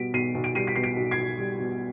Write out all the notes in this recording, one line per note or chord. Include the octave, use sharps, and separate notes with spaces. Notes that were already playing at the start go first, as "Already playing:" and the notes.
Already playing: B2 G3 B6 D7
B1 C7 D#7
B1
D7
G3 C7 D#7
B6
B2 C7
B6 D7
B1
G#6 C7
B1
G3
B2